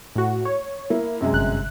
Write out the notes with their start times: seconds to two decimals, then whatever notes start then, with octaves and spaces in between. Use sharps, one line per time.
0.16 A2 F#4
0.45 C#5
0.90 A#3 E4
1.21 F#2 C3 G#3
1.33 G1 F#6